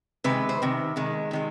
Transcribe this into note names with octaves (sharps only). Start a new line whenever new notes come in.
C3 D#3 G#3 B4
C5
C3 D#3
C3 D#3 G#3
C3 D#3 G#3